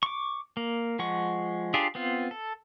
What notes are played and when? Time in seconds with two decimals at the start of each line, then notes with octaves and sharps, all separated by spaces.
0.03 C#6 D6
0.57 A#3
0.99 F3 G#3 F#5 C#6
1.74 D4 F4 G4 G#4
1.95 B3 C4 F4
2.31 A4